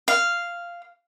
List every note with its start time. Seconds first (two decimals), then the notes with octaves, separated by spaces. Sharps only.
0.08 F5